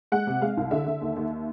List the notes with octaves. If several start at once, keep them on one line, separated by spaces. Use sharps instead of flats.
G#3 F#5
C3
G#3 F5
C2
D3 E5
D3
D#2
D#2